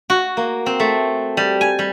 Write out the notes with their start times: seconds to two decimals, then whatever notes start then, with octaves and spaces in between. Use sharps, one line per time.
0.10 F#4
0.37 A#3
0.66 C4
0.80 A3
1.37 G3
1.61 G#5
1.79 G3